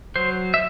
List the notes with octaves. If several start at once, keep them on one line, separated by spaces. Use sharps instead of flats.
F#3 C5
E5